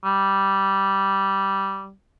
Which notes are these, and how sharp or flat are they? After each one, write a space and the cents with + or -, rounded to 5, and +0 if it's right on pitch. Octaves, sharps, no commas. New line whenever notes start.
G3 -10